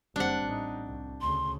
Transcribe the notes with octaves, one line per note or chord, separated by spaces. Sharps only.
F#1 G3 C4 D4 F#5
A1 D#4
C2
D2 C#3 C6